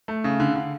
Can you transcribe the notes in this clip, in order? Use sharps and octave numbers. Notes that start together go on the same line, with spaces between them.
A3
C#3
D3
D3